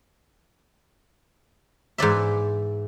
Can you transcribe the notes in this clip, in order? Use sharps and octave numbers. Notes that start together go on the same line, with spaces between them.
G#2 E3 D5 E5